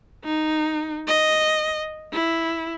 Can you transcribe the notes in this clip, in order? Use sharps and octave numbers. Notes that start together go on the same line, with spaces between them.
D#4
D#5
E4